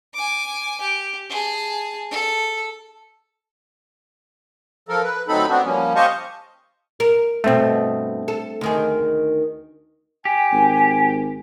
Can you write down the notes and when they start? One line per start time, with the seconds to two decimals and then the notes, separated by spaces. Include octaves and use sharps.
0.14 G#5 D6
0.81 G4
1.30 G#4 A5
2.11 A4
4.89 F3 A4 A#4
5.02 B4
5.28 D2 F#3 C4 D#4 A4 B5
5.49 B3 C4 D4 F#4
5.65 F3 G3 A#3 C#4
5.96 G4 C5 D#5 F5 A5 C#6
7.00 A#4
7.44 G2 B2 A3 C4
8.28 A4
8.61 D2 D#3 G#4
10.25 G4 G#5
10.52 G#1